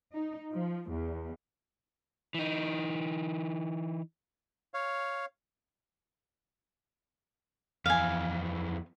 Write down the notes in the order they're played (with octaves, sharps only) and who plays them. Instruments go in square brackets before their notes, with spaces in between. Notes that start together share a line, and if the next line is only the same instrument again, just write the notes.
[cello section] D#4
F3
E2
[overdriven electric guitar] E3 D#4
[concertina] C#5 F5
[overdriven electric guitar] F2 E3 [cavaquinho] F5 G#5